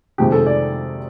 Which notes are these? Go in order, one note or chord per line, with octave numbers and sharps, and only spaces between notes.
F2 C3 D#3 G#3 G4
A4
D5